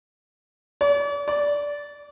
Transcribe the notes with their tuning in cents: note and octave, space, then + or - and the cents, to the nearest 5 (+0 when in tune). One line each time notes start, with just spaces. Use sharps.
D5 -45
D5 -15